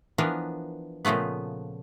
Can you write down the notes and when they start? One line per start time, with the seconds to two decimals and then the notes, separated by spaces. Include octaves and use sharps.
0.18 E3 F3 B3 D4 A#4
1.05 A#2 C#3 F3 A3 B3